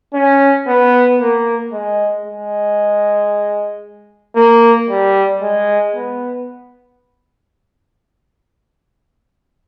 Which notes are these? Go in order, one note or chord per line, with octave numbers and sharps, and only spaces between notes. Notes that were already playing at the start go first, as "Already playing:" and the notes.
C#4
B3
A#3
G#3
G#3
A#3
G3
G#3
B3